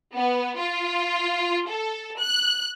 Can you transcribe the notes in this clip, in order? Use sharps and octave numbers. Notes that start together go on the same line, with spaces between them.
B3
F4
A4
F#6